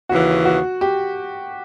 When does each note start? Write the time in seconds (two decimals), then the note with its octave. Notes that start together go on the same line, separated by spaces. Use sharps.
0.09 D#2 C#3 E3 F#4
0.45 F#4
0.81 G4